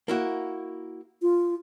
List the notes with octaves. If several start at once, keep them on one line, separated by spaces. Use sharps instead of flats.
A#3 E4 F#4
F4